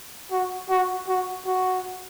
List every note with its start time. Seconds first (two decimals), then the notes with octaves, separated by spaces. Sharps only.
0.32 F#4
0.70 F#4
1.08 F#4
1.46 F#4